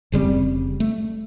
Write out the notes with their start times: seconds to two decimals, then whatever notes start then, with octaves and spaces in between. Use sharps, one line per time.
0.12 F1 C#3 G3 C4
0.80 A3